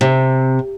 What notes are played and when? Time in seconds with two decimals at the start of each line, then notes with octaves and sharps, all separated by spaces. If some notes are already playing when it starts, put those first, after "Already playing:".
0.01 C3